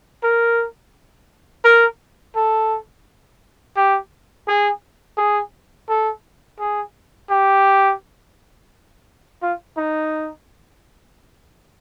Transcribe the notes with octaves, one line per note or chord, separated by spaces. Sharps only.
A#4
A#4
A4
G4
G#4
G#4
A4
G#4
G4
F4
D#4